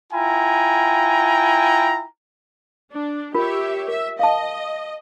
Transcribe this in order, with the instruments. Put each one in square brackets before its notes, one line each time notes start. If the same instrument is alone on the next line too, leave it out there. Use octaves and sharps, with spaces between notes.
[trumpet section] E4 F4 G5 G#5 A#5
[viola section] D4
[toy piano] F4 A#4 [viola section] G4 C#5 E5
[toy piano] A#4 [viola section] E5
[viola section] D#5 [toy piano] F5 A5